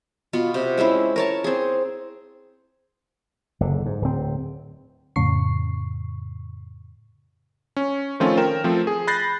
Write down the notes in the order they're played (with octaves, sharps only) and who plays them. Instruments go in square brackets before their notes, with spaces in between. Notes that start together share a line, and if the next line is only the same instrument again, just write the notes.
[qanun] B2 B3 F4
C3
G#3 C4 C#4 E4
A#4 C#5 A5
C4 G#4
[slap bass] F#1 D3
G#2
D1 C4
[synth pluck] F2 A2 C#3 C#6 C7
[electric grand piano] C#4
D#3 F3 A3 C4 C#4 F4
A#4 G5 E7
F3 A3 C4
G#4
B5 F#6 G6 A6 A#6 C7